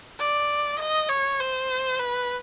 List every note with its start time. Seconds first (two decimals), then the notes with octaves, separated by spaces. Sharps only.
0.19 D5
0.79 D#5
1.09 C#5
1.40 C5
2.00 B4